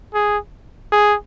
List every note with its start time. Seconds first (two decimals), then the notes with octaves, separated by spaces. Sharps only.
0.14 G#4
0.92 G#4